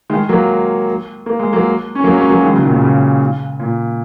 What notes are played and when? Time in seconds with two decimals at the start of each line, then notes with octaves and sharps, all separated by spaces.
0.10 D#3 G#3
0.29 F#3 A#3
1.26 A#3
1.39 G#3
1.53 F#3 A#3
1.95 C#4
2.04 F#3 A#3
2.17 G#3 C#4
2.30 F#3 A#3
2.42 D#3 G#3
2.52 C#3 F#3
2.62 A#2 D#3
2.72 A#2
2.82 C#3
3.59 A#2